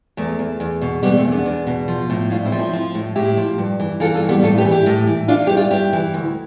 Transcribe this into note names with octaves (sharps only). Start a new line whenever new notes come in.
E2 A3
E2
E2
B2
E2 G3 B3
A3 C4
E2
B3 D4
E2
B2
F3
A2
A2 D4 F4
C4 E4
F3
C4 E4
F3
A2
A2 E4 G4
F3
G2
E3
E3 F4 A4
F4 A4
G2
G3 B3
A2 F4 A4
G4 B4
E3
E4 G4
A2
E3
E3 D4 F4
G2 G4
D4 F4
G2 E4 G4
E3
D2